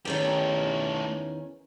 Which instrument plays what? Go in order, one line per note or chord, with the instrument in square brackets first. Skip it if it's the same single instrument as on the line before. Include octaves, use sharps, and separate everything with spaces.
[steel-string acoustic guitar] E2 D#3 C#4 [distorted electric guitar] A3 G4